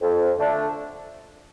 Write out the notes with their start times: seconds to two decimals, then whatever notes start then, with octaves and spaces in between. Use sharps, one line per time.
0.01 F2
0.37 D3 A3 D4